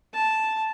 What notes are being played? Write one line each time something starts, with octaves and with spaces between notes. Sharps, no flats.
A5